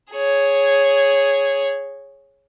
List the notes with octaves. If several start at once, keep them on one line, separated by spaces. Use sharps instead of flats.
G#4 C#5